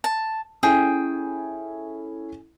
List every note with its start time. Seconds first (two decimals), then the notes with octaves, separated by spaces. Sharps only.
0.04 A5
0.63 C#4 E4 G#4 A4 G5